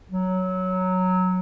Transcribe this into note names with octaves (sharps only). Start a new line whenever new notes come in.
F#3